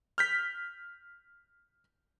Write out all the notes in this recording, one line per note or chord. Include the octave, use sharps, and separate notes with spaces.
F6 G6 B6